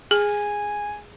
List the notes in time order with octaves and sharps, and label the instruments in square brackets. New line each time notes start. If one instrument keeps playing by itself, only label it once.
[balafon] G#4 [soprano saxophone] G#5